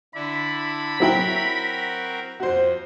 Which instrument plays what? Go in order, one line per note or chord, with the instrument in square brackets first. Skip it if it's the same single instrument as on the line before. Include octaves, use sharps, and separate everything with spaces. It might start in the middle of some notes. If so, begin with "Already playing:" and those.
[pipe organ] D3 D4 E4 [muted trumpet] B5
[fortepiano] F#3 E4 G5 [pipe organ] C4 F#4 A#4
[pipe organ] F2 [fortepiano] F#4 C5